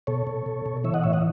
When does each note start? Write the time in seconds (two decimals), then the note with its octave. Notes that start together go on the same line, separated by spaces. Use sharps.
0.07 B2 A4 C#5
0.27 B2
0.46 B2
0.66 B2
0.84 E3 C#5 E5
0.94 D#5 F#5
1.03 A2 C#5 E5
1.13 D#5 F#5